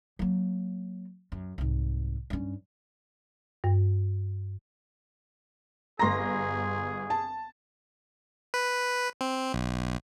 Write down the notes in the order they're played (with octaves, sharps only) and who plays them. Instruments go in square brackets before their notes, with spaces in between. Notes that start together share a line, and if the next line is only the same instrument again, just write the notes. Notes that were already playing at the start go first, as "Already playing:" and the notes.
[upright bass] F#3 A#3
F#2
C2 G#2
G2 C#4
[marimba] G2
[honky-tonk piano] G1 A#6 [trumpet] G#4 [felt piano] A#5 C6
[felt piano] A5
[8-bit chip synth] B4
C4
B1